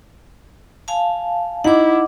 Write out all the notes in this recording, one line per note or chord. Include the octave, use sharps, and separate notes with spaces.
F5 G#5 A5
D#4 E4 F#5 D6